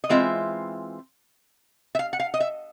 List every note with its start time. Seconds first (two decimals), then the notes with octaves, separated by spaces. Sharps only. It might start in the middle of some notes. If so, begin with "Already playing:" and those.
0.04 D#5
0.10 E3 G#3 C4 F4 E5
1.95 E5
1.99 F5
2.13 F#5
2.20 F5
2.34 D#5
2.40 E5